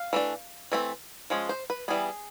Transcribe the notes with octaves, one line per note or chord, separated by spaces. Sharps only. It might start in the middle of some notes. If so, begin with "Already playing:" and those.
Already playing: F5
E3 A3 D4
E3 A3 C4
F3 G#3 C#4
C5
B4
E3 G3 B3 G#4